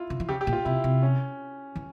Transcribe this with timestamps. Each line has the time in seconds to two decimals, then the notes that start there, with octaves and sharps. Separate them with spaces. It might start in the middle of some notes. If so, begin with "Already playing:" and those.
Already playing: E4 F4
0.10 C#3
0.20 E3
0.29 C#3 G4
0.41 G4
0.47 A#2
0.53 F4
0.65 C3 E4
0.84 C3
1.03 C#4
1.75 E3